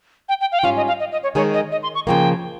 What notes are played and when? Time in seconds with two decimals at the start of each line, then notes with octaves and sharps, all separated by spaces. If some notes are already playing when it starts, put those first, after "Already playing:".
0.29 G5
0.41 G5
0.52 F5
0.59 G5
0.63 G#2 G3 C#4 F4 F5
0.77 D#5
0.88 F5
0.99 D#5
1.12 D#5
1.23 C#5
1.35 D#3 G#3 D#4 G#4 C#5
1.54 D#5
1.72 D#5
1.83 C6
1.95 C#6
2.07 C#3 F3 A#3 G5